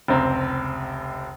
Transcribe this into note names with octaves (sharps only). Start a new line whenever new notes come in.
F1 C#2 C4 A#5